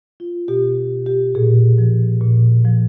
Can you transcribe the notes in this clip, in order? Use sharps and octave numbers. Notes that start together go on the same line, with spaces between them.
F4
B2 G4
G4
A#2 G#4
F3
A#2
F3